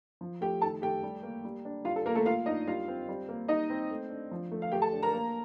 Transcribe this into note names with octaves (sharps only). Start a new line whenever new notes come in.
F3
A3 G4 G5
D#3 A4 A5
A3 G4 G5
G3
A#3
G3
D4
G3 F4 F5
A4
A#3 A#4
A3 A4
A#3 F4 F5
D4 D#4 D#5
G3 F4 F5
C4
G3
A#3
G3 D#4 D#5
C4
A3
D4
F3
A3
F5
A3 G4 G5
A4 A5
D4
A#4 A#5
A#3